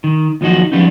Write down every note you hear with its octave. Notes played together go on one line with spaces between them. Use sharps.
D#3
D#2 F3 F#3 D#4 F#4
F3 G3 B3 C#4 D#4